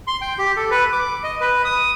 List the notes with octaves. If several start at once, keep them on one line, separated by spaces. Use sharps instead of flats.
C6
G5
G4
A4
B4
D6
D#5
B4
D#6